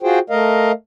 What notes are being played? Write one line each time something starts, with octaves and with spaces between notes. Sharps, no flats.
F4 F#4 G#4 C5 G5
A3 A#4 D#5 F5